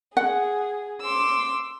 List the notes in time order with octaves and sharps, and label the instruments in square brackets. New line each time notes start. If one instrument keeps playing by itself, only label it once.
[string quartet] G#4 [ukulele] F#5
[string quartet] C6 D6 E6